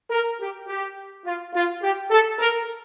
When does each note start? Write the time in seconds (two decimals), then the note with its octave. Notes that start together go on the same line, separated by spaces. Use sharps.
0.10 A#4
0.40 G4
0.67 G4
1.25 F4
1.54 F4
1.82 G4
2.10 A4
2.39 A#4